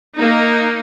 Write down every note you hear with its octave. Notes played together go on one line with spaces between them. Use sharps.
A#3 D#4